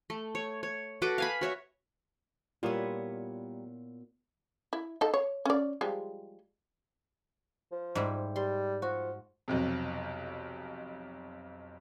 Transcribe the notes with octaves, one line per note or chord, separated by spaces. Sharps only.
A3
C#5
C#5
F#4 A4 B4 D6
F5 G#5 B5
F#4 C#5 E5
A#2 G3 A#3 B3 E4 F4 C#5
E4
D#4 A4
C#5
C#4 D5
F3 G3 G#3
F3
G#2 G3 E4
G3 C6
F3 F#4
B1 F2 C3